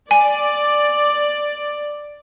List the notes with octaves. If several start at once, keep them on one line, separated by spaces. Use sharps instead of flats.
D5 G#5